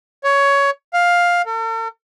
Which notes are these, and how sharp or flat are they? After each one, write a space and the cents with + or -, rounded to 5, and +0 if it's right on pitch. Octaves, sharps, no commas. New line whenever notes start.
C#5 +15
F5 +10
A4 +45